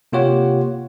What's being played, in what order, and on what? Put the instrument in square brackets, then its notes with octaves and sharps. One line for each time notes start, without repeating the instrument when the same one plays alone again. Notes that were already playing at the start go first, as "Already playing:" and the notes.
[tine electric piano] C3 A#3 F4 G4 C#5 F#5